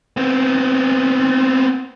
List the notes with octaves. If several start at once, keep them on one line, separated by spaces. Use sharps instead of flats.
B3 C4